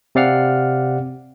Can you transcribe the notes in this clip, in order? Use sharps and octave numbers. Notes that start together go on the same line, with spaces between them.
C3 C4 D5 F5 F#5 F6